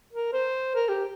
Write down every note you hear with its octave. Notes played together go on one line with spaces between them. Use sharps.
A#4
C5
A#4
G4